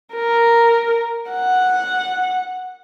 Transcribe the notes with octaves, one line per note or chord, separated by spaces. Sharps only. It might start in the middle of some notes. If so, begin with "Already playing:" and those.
A#4
F#5